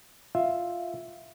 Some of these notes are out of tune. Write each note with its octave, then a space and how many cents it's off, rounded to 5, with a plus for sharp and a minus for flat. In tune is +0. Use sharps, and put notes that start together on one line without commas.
F4 +0 E5 +0